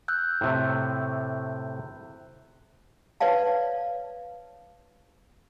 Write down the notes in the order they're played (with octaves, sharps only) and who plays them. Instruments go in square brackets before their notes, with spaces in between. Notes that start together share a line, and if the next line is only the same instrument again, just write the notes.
[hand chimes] E6 F#6 G6
[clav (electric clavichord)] A2 C3 A3
[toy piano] B4 C#5 D5 F5 A5